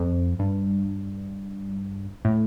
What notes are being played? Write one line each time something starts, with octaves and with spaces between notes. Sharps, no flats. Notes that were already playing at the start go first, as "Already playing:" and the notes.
Already playing: F2
G2
A2